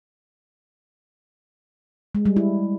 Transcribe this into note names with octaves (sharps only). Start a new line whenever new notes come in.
G#3
G3
E4